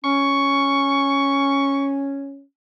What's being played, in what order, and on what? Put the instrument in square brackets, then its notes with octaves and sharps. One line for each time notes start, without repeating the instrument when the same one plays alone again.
[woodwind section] C#4 [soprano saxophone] C#6